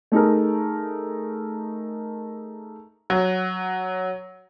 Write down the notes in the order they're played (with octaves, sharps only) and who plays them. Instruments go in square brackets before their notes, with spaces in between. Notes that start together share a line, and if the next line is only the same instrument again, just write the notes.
[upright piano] A3 D#4 G#4 A#4
[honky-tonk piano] F#3